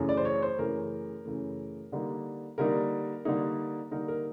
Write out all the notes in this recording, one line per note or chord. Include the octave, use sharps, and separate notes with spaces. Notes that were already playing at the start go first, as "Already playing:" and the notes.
Already playing: F#2 C#3 E3 A3
D5
C5
C#5
C5
F#2 C#3 E3 A3 A#4
F#2 C#3 E3 A3
D3 G3 A#3 D#4
D3 G3 A#3 D#4 A#4
D3 G3 A#3 D#4
D3 G3 A#3 D#4 A#4
A#4